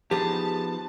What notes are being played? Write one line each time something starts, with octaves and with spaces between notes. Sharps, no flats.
F3 B3 D#4 G4 G#4 D5 A5